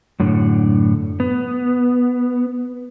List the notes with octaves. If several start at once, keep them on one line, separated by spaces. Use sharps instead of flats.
F#2 A2 D3
B3